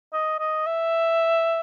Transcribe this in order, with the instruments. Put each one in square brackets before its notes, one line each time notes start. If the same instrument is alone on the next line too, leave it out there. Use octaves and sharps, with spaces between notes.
[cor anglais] D#5
D#5
E5